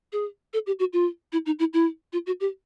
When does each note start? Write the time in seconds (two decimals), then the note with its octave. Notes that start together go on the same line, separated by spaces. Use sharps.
0.13 G#4
0.53 A4
0.67 G4
0.79 F#4
0.93 F4
1.33 E4
1.46 D#4
1.59 E4
1.73 E4
2.13 F4
2.27 F#4
2.40 G4